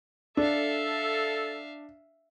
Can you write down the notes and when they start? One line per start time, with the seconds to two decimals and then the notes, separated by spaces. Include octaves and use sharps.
0.37 D4 A4 E5 F5